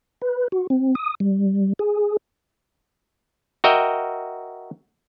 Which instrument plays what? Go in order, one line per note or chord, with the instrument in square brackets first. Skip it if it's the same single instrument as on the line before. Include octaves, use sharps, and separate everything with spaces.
[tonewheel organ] B4
F#4
C4
D#6
G3
G#4
[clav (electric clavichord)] F#4 A#4 D#5 E5 G5